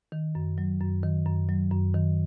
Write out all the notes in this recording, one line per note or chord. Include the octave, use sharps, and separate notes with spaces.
D#3
F#2
F#3
F#2
D#3
F#2
F#3
F#2
D#3